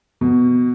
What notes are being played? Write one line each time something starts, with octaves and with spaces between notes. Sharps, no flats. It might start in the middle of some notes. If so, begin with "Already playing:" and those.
B2